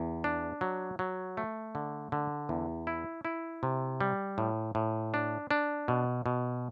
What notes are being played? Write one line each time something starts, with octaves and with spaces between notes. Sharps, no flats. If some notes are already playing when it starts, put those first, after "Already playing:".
Already playing: E2
D4
F#3
F#3
A3
D3
D3
E2
E4
E4
C3
G3
A2
A2
D4
D4
B2
B2